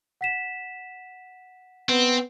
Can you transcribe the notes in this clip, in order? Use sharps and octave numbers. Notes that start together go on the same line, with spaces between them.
F#5 B6 E7
B3 C4